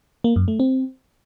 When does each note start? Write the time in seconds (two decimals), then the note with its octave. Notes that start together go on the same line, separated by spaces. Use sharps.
0.24 A#3
0.36 F#2
0.48 A3
0.60 C4